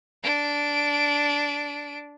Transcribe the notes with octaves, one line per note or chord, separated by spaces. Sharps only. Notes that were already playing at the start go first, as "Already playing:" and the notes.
D4 D7